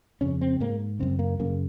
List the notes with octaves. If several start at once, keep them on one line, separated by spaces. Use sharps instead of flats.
F2 C#3 C#4
C4
G#2 A#3
F#2 C#3 C4
A#3
F#2 C#3 A#3